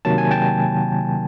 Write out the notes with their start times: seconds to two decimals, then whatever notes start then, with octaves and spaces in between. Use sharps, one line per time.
0.05 C3 D#3 F#3 A#3 A5
0.18 G#5
0.31 G5 A5